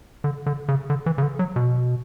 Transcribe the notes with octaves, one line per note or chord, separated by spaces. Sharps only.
D3
D3
C#3
D3
E3
C#3
D3
F#3
B2